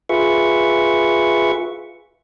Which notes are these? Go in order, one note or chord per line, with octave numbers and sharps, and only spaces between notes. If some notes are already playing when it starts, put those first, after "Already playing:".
F4 G#4 B4 E5 C#6